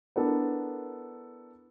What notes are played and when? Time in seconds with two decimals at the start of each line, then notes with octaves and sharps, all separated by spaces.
0.16 B3 D4 E4 A4 A#4